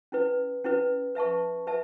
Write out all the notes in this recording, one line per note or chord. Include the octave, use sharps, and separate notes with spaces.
C#4 E4 B4
C#4 E4 B4
B4 E5 A5 C#6
B4 E5 A5